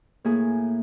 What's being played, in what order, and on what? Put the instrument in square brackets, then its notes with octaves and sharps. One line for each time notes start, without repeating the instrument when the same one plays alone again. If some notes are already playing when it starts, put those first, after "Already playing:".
[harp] A2 A#3 G#4